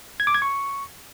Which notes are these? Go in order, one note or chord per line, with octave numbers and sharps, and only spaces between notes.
G#6
D6
G#6
C#6